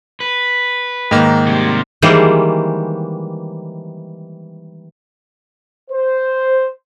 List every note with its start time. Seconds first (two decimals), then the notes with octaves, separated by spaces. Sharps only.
0.20 B4
1.11 G#2 D#3 A#3
1.47 C3 G3
2.02 D#3 E3 G3 G#3 A#3 C5
5.90 C5